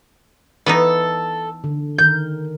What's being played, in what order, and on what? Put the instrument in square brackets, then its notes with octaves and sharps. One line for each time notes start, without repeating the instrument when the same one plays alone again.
[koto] E3 B3 D#4 [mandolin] A4
[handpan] D3
[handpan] D#3 A#4 [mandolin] G6